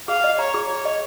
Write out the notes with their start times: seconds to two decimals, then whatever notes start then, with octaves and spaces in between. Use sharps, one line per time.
0.08 G#4 F5
0.24 D#5
0.39 C#5 A#5
0.54 G#4
0.70 G#4 C#5
0.85 D#5